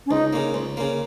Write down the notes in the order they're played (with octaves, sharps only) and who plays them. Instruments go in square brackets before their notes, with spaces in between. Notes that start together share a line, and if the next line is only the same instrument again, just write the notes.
[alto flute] C#4
[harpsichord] C#2 [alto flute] D#4
[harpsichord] C#3 A#3
C#2
C#3 A#3